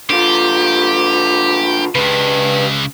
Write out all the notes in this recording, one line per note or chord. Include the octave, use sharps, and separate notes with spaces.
D3 F4 G4
C#3 G#3 G4 B4